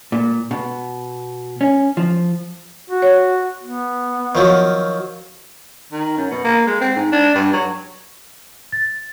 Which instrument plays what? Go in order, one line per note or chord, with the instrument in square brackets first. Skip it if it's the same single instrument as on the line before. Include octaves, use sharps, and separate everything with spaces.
[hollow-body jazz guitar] A#2
B2
C#4
F3
[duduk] F#4
[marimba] C#5
[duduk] B3
[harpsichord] D#3 F3 F#3
[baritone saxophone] D#3
F#2
B2
A#3
G#3
C4
G#2
D4
G2
F#3
[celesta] A6